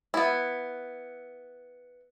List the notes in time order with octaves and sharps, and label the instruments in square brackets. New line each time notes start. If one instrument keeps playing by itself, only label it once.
[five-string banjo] B3 E4